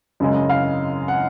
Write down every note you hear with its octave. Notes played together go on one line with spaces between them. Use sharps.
F#2 C#3 G#3
D#5
F5
F#5